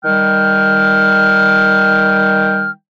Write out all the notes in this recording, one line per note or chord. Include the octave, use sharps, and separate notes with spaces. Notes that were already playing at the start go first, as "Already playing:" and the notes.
D#3 G3 G5 F6